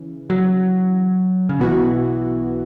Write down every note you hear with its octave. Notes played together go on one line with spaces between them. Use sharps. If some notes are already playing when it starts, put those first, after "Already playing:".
Already playing: C#3 E3
F#3
C#3
B1 B2 E3 B3 F#4